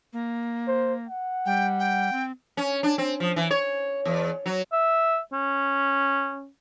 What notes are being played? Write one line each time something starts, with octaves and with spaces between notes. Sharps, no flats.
A#3
C5
F#5
G3 G5
G5
C4
C#4
D4
C4
F3
E3
C#5
E2
F#3
E5
C#4